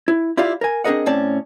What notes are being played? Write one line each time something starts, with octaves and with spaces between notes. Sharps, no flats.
E4
E4 F4 G4 D5 F5
A#4 G#5
C4 D4 G#4 A#4 D#5 F#5
A2 C4 C#4 D5 A5